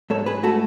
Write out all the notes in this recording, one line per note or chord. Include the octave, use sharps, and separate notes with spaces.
G#2 A4 C#5
G#4 B4
A3 F#4 A4